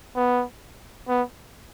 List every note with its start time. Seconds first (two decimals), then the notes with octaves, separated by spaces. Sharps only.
0.16 B3
1.08 B3